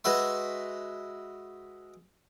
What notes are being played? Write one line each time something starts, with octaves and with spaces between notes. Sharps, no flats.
G#3 F#4 B4 E5 C6